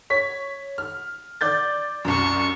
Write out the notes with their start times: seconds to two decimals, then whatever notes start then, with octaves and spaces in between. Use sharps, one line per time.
0.10 C#5 B6
0.78 F6
1.41 D5 G6 A6
2.05 C2 F#2 C5 C#6